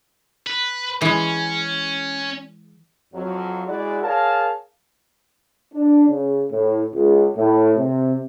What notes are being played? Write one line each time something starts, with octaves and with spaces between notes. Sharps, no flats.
B4
E3 G#3 C#4
F2 F#3
G#3 E4 F#4 G#4 D5
G#4 A#4 C#5 F5 A5
D4
C#3
A2
C#2
A2
C3